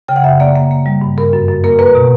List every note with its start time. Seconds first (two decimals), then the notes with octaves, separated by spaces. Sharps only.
0.08 C#3 G5
0.16 F#5
0.24 F#2 E5
0.40 A#3 D5
0.56 A#3
0.71 A#3
0.86 G3
1.01 G2
1.17 G2 A#4
1.33 F#2
1.48 F#2
1.64 A#3 A#4
1.79 A#3 B4
1.95 B2